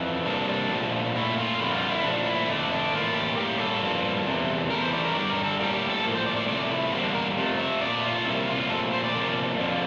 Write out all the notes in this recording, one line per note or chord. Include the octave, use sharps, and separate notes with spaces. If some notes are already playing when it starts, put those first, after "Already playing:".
Already playing: F2 E3
C3 G3 A#3 D4
D4
A#2 F3 A3
A#2 A3 E4
F4
F2 D3 G3 A#3 E4
F4
E4
A#2 F3 A3 D4
E4
F2 D3 A3 D4
D4
A2 E3 A#3 F4
G4
A2 G3 A#3 G4
A4
G2 F3 A#3
E2 C3 E3
E2 E3 A3 A#4
C5
D5
A#4
G2 D3 G3 D5
A#4
A4
A2 G3 A#3 G4
G4
A4
A2 F3 A#3
C5
D5
D5
C3 F3 A3 D5
E4
E2 D3 G3 A#3 C4
D4
A#4
F2 C3 F3 A3
E5
A#2 A3 D5
F4
C3 G3 A#3 E4
F4
A#2 F3 A3 A4
C5
D5
C3 F3 A#3
F2 D3 F3